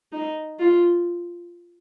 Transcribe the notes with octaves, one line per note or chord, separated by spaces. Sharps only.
D#4
F4